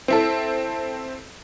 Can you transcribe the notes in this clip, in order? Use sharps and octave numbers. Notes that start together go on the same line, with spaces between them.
C4 E4 A4